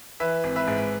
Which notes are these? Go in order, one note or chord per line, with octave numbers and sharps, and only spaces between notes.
E3 B4 E5
G#1
B4 E5
G#2